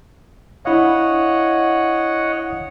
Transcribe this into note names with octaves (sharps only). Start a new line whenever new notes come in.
D4 E4 C#5 D#5 F5 F#5